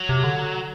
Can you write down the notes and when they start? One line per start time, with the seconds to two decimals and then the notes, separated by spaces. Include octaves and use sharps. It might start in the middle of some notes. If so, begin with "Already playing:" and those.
Already playing: F#3
0.09 C3
0.24 D3